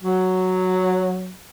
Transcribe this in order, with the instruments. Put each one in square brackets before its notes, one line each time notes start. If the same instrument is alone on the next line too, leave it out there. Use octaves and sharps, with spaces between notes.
[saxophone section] F#3